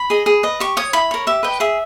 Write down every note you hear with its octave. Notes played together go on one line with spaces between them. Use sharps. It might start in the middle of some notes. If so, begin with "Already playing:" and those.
Already playing: B5
G#4 D#5
G#4
B4 D#5
G4 C#6
C#5 D#6
E4 B5
A#4 C#5
G4 E5
B4 D#5 G5
G#4 E5